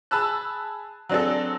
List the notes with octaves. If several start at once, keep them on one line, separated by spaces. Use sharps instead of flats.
G#4 A5 B5 E6 F#6
F#3 C4 D4 G#4 A4